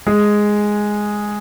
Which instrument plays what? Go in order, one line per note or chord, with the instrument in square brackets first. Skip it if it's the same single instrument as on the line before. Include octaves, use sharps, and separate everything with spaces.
[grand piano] G#3 G#4